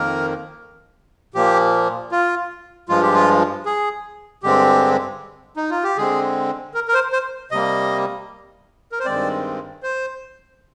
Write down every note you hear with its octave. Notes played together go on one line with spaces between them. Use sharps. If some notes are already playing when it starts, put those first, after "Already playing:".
Already playing: F2 D#3 A#3 A#4
A#2 F3 A#3 G4
F4
G2 F3 G#3 F4
G4
F4
G#4
G2 D3 G#3 C4 G4
D#4
F4
G4
D3 G#3 C4 G#4
A#4
A#4
C5
C5
C3 G3 A#3 D#5
A#4
C5
G2 D#3 G#3 C4 D5
C5